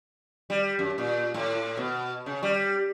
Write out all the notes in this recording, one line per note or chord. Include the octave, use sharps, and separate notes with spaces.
G3
F#2
A#2
A2
B2
C#3
G3